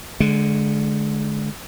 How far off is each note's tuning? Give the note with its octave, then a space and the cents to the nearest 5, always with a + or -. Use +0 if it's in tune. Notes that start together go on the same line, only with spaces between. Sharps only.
D3 +0 G#3 +25